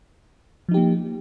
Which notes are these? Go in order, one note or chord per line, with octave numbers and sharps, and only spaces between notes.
F3 A#3 D#4 G4